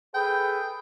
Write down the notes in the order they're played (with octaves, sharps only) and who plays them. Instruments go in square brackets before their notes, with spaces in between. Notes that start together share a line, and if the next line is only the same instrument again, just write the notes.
[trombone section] G#4 A4 B4 [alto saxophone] G5